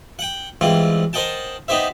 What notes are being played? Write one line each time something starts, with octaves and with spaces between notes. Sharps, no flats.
F#5 G5
G#2 E3 G3 C4 F4
A#4 C5 D#5 F#5 G5 A5
B3 D#4 G4 C5 E5